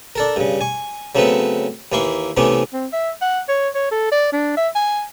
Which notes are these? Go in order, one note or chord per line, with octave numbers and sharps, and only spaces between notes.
D4 A4 A#4
G2 C#3
G#5 C#6
C#3 F#3 A3 B3 C4 B4
D#2 E3 A#3 E4 C6 C#6
C3 E3 A3 B3 C#4 D6
C4
E5
F#5
C#5
C#5
A4
D5
D4
E5
G#5